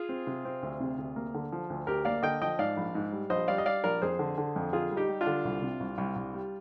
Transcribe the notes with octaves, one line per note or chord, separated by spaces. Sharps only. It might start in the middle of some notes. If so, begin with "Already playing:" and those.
Already playing: F4 G#4
C4
C3
C4
D2
C3
D2
A#3
D3
F3
D2
D2 G4 A#4
A#3 D5 F5
D3 D#5 G5
F3 D#5 G5
G#2 D5 F5
A#1
G#2
G3
A#1 C5 D#5
G3 D5 F5
D#5
G3 D5 F5
A#1 A#4 D5
F2 G#4 C5
D3
D3
F2
D3 F4 G#4
G3
D#4 G4
G3
D4 F4
D3
C2
C3
C2
C2
C2
G3